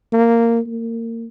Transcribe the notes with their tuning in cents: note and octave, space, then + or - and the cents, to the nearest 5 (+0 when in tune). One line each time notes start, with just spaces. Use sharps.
A#3 -10
A#3 -30